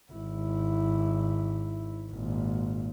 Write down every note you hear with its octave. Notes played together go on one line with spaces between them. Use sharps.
G#1 E4
G#1 A#2